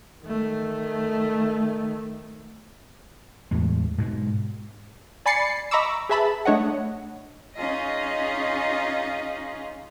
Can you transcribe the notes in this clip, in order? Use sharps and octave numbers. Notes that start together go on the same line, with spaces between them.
D#3 A3
E2 A2 G#3
G#2 B2 G#3
D5 G#5 B5 A6 C7 C#7
D#5 A#5 B5 C#6 D6 E6
G#4 B4 E5 A5 B5
A3 D4 C#5 D#5 F#5
C#4 D#4 F4 G#4 D#5